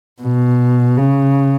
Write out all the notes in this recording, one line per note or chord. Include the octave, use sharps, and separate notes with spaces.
B2
C#3